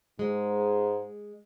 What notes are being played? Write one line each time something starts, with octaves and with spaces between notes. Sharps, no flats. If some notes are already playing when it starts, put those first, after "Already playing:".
G#2 G#3